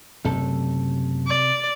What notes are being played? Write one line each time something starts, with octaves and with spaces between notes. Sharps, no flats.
F#1 F#2 C3 A3 A4
D5